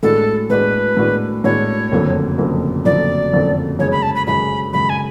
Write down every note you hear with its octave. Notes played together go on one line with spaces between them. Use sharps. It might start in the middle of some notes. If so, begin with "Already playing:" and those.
A2 G#3 D4 F#4 A4
A2 G#3 D4 F#4 B4
A2 G#3 D4 F#4
A2 G#3 D4 F#4 C#5
F#1 F2 D3 F#3
F#1 F2 D3 F#3
F#1 F2 D3 F#3 D5
F#1 F2 D3 F#3
F#2 C#3 G#3 C#5
B5
A5
B5
F#2 C#3 G#3 B5
F#2 C#3 G#3 B5
G#5